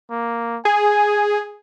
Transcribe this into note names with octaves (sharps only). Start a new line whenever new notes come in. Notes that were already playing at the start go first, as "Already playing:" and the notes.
A#3
G#4 G#5